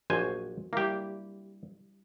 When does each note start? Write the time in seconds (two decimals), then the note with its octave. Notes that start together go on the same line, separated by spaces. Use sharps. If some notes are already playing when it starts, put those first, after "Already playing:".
0.10 A#1 F#3 F#4 C5 G#5
0.73 G3 A#3 E4 G4